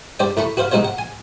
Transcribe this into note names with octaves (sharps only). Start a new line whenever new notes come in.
G2 C5 D5 G5
A2 A3 A#5 B5 C#6
F#4 B4 C5 F5
B1 G#3 D#4 F#4 C5 C#5
F#5
G#5